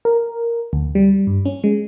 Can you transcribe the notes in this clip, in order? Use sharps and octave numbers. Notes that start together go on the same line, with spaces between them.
A#4
D2
G3
G2
C#4
G#3